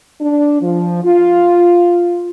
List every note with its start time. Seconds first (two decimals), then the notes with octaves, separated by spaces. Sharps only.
0.20 D4
0.61 F3
1.04 F4